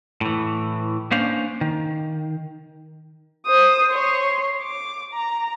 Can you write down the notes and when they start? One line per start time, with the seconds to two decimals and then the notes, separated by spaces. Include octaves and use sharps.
0.21 A2 E3
1.11 A#3 C#4 D4 C5 F5
1.61 D#3
3.47 C5 D#6
3.91 C#5 C6
4.62 D6
5.14 A#5